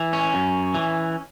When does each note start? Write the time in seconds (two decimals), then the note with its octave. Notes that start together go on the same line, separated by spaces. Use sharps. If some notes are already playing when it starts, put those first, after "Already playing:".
Already playing: E3
0.13 C#4
0.34 F#2
0.74 E3